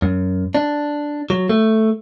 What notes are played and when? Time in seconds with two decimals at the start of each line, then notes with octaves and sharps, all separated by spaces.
0.02 F#2
0.55 D4
1.30 F#3
1.49 A3